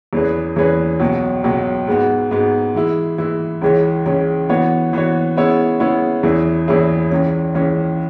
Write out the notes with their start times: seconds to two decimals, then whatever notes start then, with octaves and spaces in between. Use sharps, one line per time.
0.13 E2 E3 C#4 G#4 B4
0.56 E2 E3 C#4 G#4 B4
1.00 C#2 B2 F#3
1.44 C#2 B2 F#3
1.88 G#2 G#3 B3 F#4
2.31 G#2 G#3 B3 F#4
2.75 E3 G#3 E4
3.18 E3 G#3 E4
3.61 C#2 C#3 E3 G#3 C#4
4.06 C#2 C#3 E3 G#3 C#4
4.49 E3 B3 F#4 C#5
4.93 E3 B3 F#4 C#5
5.36 C#3 G#3 B3 E4 C#5
5.80 C#3 G#3 B3 E4 C#5
6.23 E2 E3 C#4 E4 G#4
6.68 E2 E3 C#4 E4 G#4
7.11 C#2 C#3 E3 C#4
7.54 C#2 C#3 E3 C#4